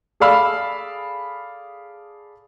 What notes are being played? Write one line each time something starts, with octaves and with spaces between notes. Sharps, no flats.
G#4 A4 D5 F5 B5 E6